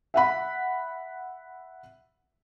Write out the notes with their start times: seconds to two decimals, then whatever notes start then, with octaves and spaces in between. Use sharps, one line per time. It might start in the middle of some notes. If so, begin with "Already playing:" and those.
0.14 E5 F#5 B5